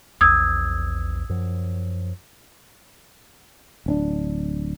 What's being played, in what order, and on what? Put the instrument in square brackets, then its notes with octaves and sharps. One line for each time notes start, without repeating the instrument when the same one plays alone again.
[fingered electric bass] A#1 E2 [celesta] D#6 E6 G#6
[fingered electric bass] F#2 F3
[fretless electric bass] D1 C#4 D4